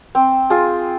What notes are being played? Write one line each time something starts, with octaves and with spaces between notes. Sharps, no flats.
C4
F4 G#4